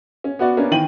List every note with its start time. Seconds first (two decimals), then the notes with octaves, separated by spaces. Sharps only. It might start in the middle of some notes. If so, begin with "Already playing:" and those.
0.24 C#4
0.39 B3 F#4 D5
0.57 A#3 B3 C#4 D4
0.71 D#3 E3 G5 D#7 F#7